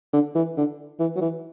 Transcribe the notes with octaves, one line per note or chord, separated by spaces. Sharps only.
D3
E3
D3
E3
F#3
E3